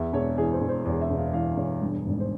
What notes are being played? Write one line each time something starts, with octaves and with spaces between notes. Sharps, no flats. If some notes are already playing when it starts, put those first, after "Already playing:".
Already playing: E2 E5
E1 C#5
E3 G#4
C5
E1
C5
E2 C#5
E5
E1
F5
E3 F5
E1 C#5
G2
G#1
C5